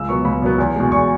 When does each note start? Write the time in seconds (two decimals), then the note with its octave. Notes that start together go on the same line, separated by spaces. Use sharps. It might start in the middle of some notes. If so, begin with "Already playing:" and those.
Already playing: C#2 E6
0.09 B2 F#3 B3 C#6
0.25 C#2 B5
0.42 B2 F#3 B3
0.58 E2
0.76 B2 G#3
0.92 E2 C#6